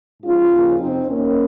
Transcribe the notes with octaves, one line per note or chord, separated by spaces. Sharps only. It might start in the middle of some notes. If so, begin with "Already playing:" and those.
G#2 F3 C#4 F4
D#2 C#3 F3
F2 C3 F3 C4 D#4
D#2 D#3 A#3 C#4